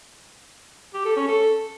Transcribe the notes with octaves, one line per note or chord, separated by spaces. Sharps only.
G4
A4
C#4
A4